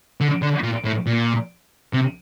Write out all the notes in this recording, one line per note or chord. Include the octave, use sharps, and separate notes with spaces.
D3
D3
A#2
A2
A#2
C3